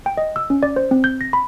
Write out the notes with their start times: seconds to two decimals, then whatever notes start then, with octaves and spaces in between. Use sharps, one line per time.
0.06 G5
0.17 D#5
0.36 E6
0.50 C#4
0.63 D5
0.76 C5
0.91 C4
1.04 G6
1.21 A#6
1.33 B5